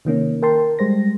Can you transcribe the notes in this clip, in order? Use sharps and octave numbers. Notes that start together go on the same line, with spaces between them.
C3 D#3 A#3 C#4
A#4 G5 A5 C6
G3 G#3 C5 A#6